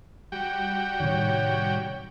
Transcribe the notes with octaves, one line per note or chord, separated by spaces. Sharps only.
G3 F#4 G4 G5
A2 C3 D#3 C#5